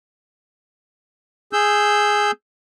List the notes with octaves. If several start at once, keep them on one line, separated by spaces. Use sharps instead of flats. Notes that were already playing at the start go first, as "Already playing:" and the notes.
G#4 E6 G6